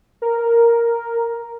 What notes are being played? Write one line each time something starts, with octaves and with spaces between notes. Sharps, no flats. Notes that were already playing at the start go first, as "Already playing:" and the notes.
A#4